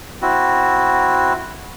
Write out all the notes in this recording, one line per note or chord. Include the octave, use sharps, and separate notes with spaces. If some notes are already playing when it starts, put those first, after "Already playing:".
C4 E4 F#4